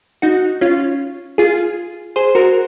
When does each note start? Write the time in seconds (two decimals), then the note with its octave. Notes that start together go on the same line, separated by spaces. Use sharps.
0.22 D#4 F#4
0.61 C#4 F4
1.38 F4 G#4
2.16 G#4 C5
2.35 F#4 A#4